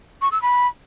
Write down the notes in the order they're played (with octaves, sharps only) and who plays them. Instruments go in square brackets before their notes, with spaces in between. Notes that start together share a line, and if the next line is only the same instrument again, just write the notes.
[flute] C#6
E6
B5